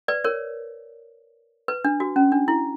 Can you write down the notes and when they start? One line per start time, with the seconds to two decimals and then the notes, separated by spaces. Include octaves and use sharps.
0.08 B4 D5
0.24 A#4 C#5
1.68 B4
1.85 D4
2.00 F#4
2.16 C#4
2.32 D4
2.48 E4